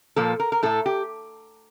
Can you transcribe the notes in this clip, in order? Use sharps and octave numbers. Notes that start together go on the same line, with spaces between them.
A#2 F3 A#3 A4
A#4
A#4
A2 A3 A4
G4